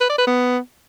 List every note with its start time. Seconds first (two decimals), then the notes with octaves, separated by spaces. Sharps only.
0.01 B4
0.09 D5
0.18 B4
0.26 B3